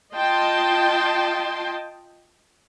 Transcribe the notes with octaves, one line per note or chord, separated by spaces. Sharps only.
F4 D#5 G5 A5 C6